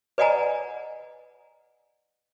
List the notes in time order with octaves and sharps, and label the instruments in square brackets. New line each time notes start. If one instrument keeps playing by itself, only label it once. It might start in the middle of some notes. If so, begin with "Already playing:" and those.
[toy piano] B4 D5 D#5 F#5 G#5 A#5